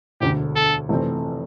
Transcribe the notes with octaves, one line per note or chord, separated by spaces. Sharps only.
E1 D2 D3 G4
A4
F1 F2 E3 A3 C4